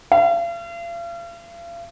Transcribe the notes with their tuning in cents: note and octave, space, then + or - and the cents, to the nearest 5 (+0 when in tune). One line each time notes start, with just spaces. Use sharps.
F5 -40